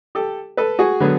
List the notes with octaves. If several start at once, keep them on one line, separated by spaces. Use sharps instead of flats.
G4 A4
A4 B4
F#4 G#4
D3 F#3 B3